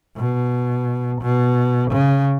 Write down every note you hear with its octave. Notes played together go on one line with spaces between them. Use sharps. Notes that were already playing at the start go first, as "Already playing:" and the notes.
B2
B2
C#3